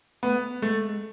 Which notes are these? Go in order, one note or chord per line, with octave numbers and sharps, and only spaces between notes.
A3 B3
G#3 A3